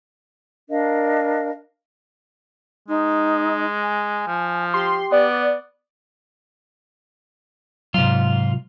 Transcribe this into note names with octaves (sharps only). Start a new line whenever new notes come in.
D4 A#4 D#5 F5
G#3 D#4
G#5
F3
G4 C6
B3 D5
G#2 C3 F#3 F4